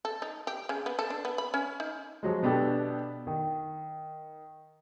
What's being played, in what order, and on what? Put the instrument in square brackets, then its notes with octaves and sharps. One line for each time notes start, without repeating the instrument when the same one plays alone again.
[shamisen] A4
D#4
G4
C#3
B3
A4
D4
B3
B5
C#4
D#4
[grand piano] F3 F#3 G#3
B2 B3 D4 G4 A4
D#3